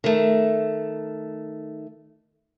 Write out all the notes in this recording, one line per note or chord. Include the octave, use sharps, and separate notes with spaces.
D#3 A3